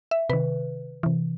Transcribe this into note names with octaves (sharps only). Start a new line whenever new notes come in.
E5
C3 D#3 B4
C3 E3